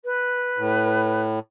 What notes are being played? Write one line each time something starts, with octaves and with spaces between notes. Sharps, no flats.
B4
A2